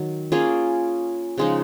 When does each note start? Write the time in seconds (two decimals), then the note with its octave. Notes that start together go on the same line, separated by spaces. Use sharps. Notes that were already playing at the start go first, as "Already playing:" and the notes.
Already playing: D#3 F#3
0.32 A#3 C#4 F4 G#4
1.38 C#3 F3 G#3 D#4